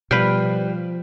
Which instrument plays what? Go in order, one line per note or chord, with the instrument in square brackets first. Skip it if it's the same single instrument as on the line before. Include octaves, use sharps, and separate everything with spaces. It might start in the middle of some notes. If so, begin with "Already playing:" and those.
[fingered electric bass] B2 [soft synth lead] F3 [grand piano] G3 [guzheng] B4 F5 G5